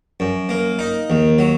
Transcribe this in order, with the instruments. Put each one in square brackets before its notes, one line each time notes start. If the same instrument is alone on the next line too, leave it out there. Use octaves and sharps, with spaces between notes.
[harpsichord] F#2
A#3
D#4
D#2
F#3